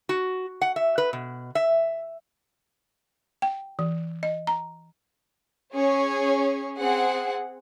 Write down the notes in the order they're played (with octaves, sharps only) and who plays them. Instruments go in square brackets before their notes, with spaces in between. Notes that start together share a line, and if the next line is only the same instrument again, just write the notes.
[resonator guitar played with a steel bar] F#4
F#5
E5
B4
B2
E5
[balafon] G5
E3
D#5
A#5
[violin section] C#4 G#4 C#5
C4 G#4 F#5